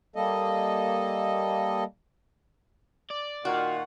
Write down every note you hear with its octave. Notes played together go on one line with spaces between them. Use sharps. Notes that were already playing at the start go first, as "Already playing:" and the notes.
G3 A#3 A4 D#5
D5
A#2 D#3 F4 F#4 F#5